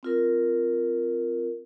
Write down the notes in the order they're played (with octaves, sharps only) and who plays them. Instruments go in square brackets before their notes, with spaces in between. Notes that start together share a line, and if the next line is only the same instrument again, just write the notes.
[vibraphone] C4 F4 A#4